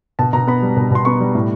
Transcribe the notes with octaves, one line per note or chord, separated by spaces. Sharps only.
B2 A5
B2 A#5
B3 B5
G3
B2
B2 C6
B3 C#6
G3
A2